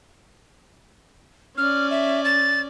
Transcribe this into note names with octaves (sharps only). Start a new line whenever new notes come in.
C#4 D5 F6
E5
A6